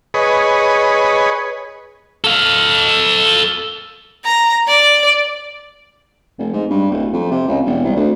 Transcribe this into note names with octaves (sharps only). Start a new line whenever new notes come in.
G#4 B4 C#5 D#5
A4 F5
A#5
D5
F1
G#2
G2
D1
F2
C3
C#2
E1
C2
D2